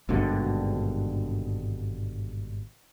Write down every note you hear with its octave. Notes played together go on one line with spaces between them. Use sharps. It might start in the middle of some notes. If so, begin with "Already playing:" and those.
G#1 G2 B2 D3